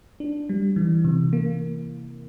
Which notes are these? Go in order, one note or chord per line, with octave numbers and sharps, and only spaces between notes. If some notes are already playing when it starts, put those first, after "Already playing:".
D4
G3
E3
C3
A#3